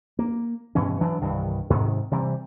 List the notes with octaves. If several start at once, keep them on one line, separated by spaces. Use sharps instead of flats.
A#3
G2 B2 E3 C#4
E3 F#3 D4
C2 G2 D#3 E3
G#2 C3 D#3
C3 E3 G3